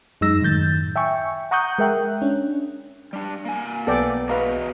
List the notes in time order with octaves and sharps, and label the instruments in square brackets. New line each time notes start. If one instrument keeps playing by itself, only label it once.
[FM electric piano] F#2 G#3 D#4 E6 A#6
F#2 A2 D#3 G6 A6
E5 G5 G#5 C#6
F#5 A#5 C#6 D#6 F#6 G6
G#3 A#4 E5 G5 F#6
C#4 D4
[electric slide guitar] G3 D4
A#3 G#5
[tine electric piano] B1 B3 [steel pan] A4 D5 G5
[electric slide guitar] F#4 G#4 D#5 [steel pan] B4 F5 A#5